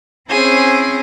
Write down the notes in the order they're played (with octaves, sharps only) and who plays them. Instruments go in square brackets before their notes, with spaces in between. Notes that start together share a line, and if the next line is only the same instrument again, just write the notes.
[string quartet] C4 C#4 E4 G#4 C5